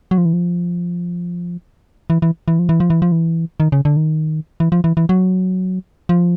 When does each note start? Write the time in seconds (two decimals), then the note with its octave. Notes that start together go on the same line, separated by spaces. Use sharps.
0.11 F#3
0.18 F3
0.25 E3
0.33 F3
2.10 E3
2.22 E3
2.48 E3
2.59 F3
2.69 E3
2.80 F3
2.90 E3
3.02 F3
3.12 E3
3.60 D#3
3.72 C#3
3.85 D3
3.97 D#3
4.60 E3
4.72 F3
4.84 E3
4.97 E3
5.09 F#3
6.09 F3